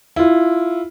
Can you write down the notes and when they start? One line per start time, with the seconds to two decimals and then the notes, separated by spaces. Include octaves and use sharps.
0.16 E4 F4